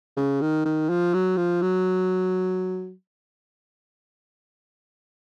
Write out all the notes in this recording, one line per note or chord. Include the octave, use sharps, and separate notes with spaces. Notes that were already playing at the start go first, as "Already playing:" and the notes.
C#3
D#3
D#3
F3
F#3
F3
F#3